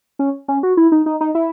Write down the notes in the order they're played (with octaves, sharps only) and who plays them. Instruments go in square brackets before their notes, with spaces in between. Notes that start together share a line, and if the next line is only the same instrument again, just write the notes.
[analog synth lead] C#4
C#4
F#4
E4
D#4
D#4
D#4
E4